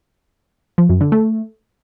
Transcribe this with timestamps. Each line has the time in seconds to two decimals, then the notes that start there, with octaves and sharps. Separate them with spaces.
0.78 F3
0.89 F#2
1.01 D3
1.12 A3